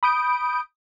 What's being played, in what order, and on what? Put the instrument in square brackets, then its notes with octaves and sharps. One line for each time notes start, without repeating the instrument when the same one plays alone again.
[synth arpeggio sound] B5 D#6 G6 D7